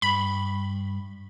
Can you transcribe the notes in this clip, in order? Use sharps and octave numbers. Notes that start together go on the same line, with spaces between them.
G2 B5